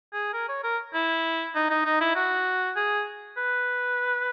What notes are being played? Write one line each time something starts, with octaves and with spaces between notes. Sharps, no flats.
G#4
A#4
C#5
A#4
E4
D#4
D#4
D#4
E4
F#4
G#4
B4